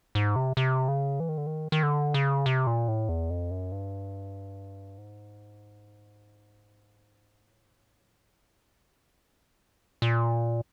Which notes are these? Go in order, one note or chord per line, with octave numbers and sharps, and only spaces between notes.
G#2
C3
C3
C#3
E3
D#3
D3
D#3
D#3
D3
C#3
C3
A#2
A2
E2
F2
F#2
G2
G#2
A2
G#2
A2
A#2
A#2